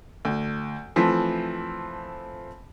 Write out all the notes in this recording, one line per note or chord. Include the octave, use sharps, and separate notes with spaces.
D2
E3 F3 A3 C4